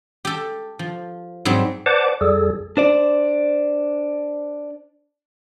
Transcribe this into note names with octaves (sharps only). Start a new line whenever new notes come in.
G4 A4
F3
G#2 F#3 G3 C4
B4 C5 D5 F#5 A5 D6
F2 G3 G#4 A4
D4 C5 D5